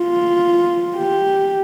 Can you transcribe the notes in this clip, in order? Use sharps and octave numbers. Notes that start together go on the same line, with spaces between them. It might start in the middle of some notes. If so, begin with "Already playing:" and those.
Already playing: F4
G4